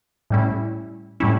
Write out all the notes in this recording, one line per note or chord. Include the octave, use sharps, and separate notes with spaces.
A2 G3 C#4 E4
A2 G3 C#4 E4